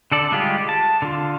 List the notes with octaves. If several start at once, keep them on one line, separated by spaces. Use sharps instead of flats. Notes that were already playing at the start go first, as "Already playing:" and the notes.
D3 A4 D5
G3 G#3 F4 G4 G#4
A5
D3 F4